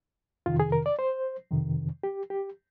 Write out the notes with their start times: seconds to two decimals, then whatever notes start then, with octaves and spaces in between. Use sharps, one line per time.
0.46 F2 C3 D#3 F4
0.60 G#4
0.72 A#4
0.86 D5
0.99 C5
1.51 F2 C3 D#3
2.03 G4
2.30 G4